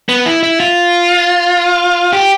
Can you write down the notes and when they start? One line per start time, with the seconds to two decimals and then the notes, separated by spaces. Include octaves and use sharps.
0.09 B3
0.26 E4
0.43 E4
0.60 F4
2.13 G4